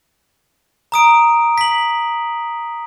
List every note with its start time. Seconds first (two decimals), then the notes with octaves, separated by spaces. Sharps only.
0.92 A#5 D#6 D7
1.58 B6 F#7